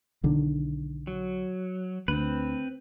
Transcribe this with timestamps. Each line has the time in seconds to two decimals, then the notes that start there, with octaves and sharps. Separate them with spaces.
0.24 B1 D3 D#3
1.07 F#3
2.08 D2 C4 B4